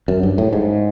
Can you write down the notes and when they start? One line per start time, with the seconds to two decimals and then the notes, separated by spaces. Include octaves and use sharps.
0.08 F#2
0.23 G2
0.38 A2
0.53 G#2